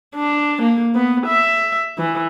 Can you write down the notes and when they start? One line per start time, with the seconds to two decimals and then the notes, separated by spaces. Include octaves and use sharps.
0.16 D4
0.62 A#3
0.95 B3
1.26 E5
1.98 E3